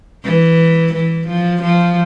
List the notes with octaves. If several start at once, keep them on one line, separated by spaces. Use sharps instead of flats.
E3
E3
F3
F3